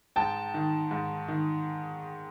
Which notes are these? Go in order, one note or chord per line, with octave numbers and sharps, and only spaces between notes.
G#2 G5 A5
D#3
G#2
D#3